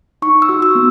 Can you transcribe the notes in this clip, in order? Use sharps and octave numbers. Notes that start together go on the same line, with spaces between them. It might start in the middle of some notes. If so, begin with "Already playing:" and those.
D#4 C#6
E6
F#4
E6
B3